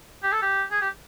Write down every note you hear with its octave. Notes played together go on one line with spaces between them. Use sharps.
G4
A4
G4
G#4
G4